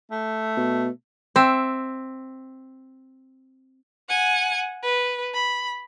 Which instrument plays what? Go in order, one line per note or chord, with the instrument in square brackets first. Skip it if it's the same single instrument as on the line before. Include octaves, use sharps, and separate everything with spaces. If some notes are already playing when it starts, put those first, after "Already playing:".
[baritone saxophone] A3
[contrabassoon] B2
[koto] C4 E5
[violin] F#5 G#5
B4
B5